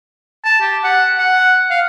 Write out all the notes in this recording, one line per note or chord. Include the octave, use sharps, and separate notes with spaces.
A5
G4
F#5
F#5
F5